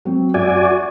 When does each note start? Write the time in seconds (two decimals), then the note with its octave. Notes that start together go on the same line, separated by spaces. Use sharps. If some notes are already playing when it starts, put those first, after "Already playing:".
0.05 F#3 C4
0.34 F#2 F#4 D5 E5 G#5
0.64 C#6